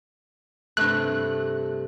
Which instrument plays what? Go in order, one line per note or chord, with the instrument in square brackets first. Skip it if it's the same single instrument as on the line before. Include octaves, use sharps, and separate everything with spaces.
[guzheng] G2 C3 A3 [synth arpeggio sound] F#6